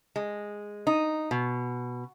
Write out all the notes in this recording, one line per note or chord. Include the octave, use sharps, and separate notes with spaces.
G#3
D#4
B2